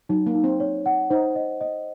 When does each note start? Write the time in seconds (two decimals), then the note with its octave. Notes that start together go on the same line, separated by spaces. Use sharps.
0.09 F#3 D#4
0.27 A#3
0.34 D#4
0.44 C4
0.60 C#5
0.86 F#5
1.10 D#4 C5
1.36 D#5
1.61 D#5